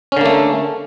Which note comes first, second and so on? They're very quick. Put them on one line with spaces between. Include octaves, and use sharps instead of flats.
C#4 D3 A#3 A3